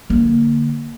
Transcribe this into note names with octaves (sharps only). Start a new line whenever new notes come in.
D3 A#3